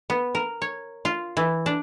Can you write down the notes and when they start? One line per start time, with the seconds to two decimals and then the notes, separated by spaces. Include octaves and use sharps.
0.10 B3
0.35 A#4
0.62 C#5
1.05 F4
1.37 E3
1.66 D4